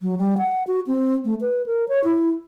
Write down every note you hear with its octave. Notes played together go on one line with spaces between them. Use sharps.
F#3
G3
F#5
F#4
C4
A3
B4
A#4
C#5
E4